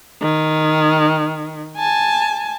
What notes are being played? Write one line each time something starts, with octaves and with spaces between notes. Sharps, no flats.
D#3
G#5 A5